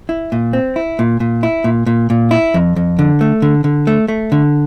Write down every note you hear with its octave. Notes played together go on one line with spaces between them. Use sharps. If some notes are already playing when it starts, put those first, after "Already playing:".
E4
A#2
C4
E4
A#2
A#2
E4
A#2
A#2
A#2
E4
F2
F2
D3
A3
D3
D3
A3
A3
D3